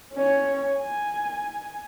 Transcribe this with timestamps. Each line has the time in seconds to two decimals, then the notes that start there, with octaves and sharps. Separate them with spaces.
0.14 C#4 C#5
0.76 G#5